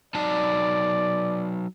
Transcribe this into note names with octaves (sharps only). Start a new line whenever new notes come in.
F#3 D#4 D5 A5